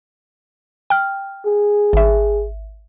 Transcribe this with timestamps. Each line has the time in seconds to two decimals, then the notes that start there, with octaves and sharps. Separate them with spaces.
0.90 G5 F6
1.46 G#4
1.93 G#1 E5